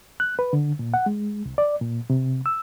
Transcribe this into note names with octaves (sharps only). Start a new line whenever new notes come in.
F#6
B4
D3
A#2
F#5
G#3
C2
D5
A#2
C3
E6